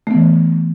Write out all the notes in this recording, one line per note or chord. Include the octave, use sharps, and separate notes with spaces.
E3 A3 B3